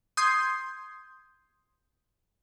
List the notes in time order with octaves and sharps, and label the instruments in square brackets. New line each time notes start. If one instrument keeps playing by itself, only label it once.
[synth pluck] C6 D#6 G6 G#6 C7